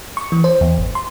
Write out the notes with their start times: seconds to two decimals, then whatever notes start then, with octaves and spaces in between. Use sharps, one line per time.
0.17 C#6
0.32 E3
0.44 C5
0.61 E2
0.78 G#1
0.95 C6